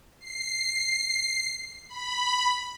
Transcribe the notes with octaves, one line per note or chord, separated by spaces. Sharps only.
C7
B5